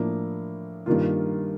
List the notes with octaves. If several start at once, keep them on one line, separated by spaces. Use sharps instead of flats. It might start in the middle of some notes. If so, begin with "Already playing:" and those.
Already playing: A2 F3 A#3 D4
G2 D#3 A#3 F4